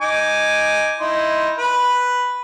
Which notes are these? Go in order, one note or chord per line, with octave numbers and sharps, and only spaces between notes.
D#4 G#5 D6
D#4 E4 C6
B4